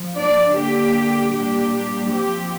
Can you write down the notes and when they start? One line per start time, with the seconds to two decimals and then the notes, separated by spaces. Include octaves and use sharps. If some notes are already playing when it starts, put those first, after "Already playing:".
Already playing: F3
0.16 D4 D5
0.55 D3 A#3 D4 G4
1.32 A#2 G3 D4 G4
2.10 F3 C4 G4